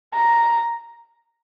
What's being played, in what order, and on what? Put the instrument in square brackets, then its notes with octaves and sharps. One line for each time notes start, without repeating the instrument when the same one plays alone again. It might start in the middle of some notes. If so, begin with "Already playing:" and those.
[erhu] A#5